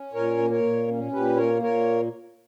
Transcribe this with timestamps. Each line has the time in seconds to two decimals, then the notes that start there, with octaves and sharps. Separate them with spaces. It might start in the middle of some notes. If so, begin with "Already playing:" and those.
Already playing: C#4
0.13 A#2 A#4 C#5
0.38 A#3
0.50 A#4 C#5
0.63 A#2
0.88 C#4
1.12 A#2 G4 B4
1.37 A#3 A#4 C#5
1.62 A#2 A#4 C#5